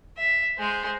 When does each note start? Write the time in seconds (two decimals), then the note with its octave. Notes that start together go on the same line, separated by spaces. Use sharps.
0.17 E5
0.58 G#3 C5